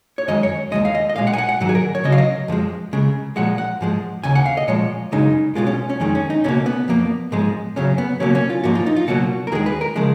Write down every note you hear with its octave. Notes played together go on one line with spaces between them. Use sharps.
C#5
F#2 D#3 G#3 D#5
C#5
D#2 D#3 G#3 D#5
F5
D#5
D#5
B1 A#2 G#3 F5
F#5
G#5
F#5
F#5
G#2 D#3 F#3
G#4
A#4
C#5
C#2 C#3 F#3 D#5
F5
D#5
F2 F3 G#3
C#2 C#3 G#3
A#2 F3 G#3 F#5
F#5
G#2 F3 G#3
D#2 C#3 G#5
F#5
F5
D#5
A#2 F3 G#3 C#5
F#2 C#3 G#3 D#4
B1 B2 G#3 F4
C#4
C#4
F2 D#3 G#3 C#4
C#4
D#4
C#2 B2 A#3 C#4
B3
F2 F3 A#3
G#2 F3 G#3
F#2 C#3 F#3 C#4
B3
C#2 B2 F#3 A#3 C#4
C#4
F4
G#2 F3 A#3 F#4
F4
D#4
F4
C#2 B2 F#3 A#3 F#4
A#4
D#2 D#3 G#3 G#4
B4
A#4
C#3 F3 G#3